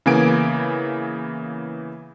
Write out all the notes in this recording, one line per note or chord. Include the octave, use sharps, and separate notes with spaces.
C#3 E3 A#3 B3 G#5 D7